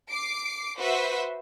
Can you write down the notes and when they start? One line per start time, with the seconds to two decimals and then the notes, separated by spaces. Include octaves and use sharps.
0.10 D6 C7 D7
0.79 F#4 B4 C5 E5